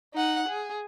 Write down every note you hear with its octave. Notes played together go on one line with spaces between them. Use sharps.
D#4 F#5
G#4